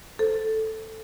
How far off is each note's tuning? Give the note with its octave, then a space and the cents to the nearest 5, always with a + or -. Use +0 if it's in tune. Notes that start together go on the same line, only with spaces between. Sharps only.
A4 +0 C5 +0